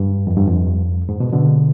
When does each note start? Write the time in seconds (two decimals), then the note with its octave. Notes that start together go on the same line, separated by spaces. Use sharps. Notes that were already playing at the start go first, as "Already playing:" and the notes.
Already playing: G2
0.27 F2
0.37 G2
0.47 F2
1.09 G#2
1.20 B2
1.33 B2 D3